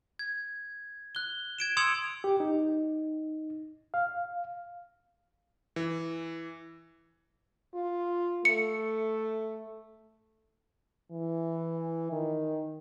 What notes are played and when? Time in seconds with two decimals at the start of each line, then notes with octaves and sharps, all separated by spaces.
0.19 G#6
1.15 F#6 G7
1.59 G#6 D7 E7
1.77 C6 D#6 E6 G#6 C#7 F7
2.24 G4
2.40 D#4
3.94 F5
5.76 E3
7.75 F4
8.45 A3 C#7
11.11 E3
12.12 D#3